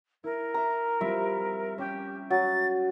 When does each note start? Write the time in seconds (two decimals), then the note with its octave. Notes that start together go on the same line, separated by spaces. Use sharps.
0.24 E4 A#4
0.54 E5 A#5
1.01 G3 C4 F4 E5
1.78 C#4 G4 E5 G6
2.30 F#3 A6